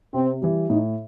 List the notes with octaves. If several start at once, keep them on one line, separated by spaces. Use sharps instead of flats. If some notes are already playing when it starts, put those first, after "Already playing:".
C3 C4
E3 G3
A2 D#4